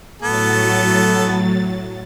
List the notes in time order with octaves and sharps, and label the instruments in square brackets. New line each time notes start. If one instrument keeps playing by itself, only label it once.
[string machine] A2 F#3 A6 [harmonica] A3 B3 A4